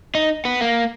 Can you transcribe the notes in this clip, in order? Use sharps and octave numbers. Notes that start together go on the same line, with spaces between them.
D#4
B3
A#3